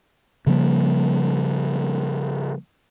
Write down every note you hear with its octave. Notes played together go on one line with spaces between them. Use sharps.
C#3 F3 G3 A#3